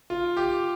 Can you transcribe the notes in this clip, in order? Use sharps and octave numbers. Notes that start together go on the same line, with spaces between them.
F4
G4